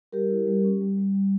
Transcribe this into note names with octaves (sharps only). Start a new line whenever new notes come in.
G3 G4 A#4
E4
G3
C#4
G3
G3
G3